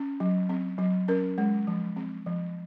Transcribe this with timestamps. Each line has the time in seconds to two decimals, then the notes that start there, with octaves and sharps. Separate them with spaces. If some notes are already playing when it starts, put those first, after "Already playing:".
Already playing: C#4
0.20 F#3
0.49 C4
0.78 F#3
1.08 C#4 A#4
1.38 G#3
1.67 F3
1.96 C4
2.26 F3